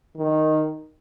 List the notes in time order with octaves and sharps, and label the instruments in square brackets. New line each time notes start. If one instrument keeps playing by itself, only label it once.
[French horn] D#3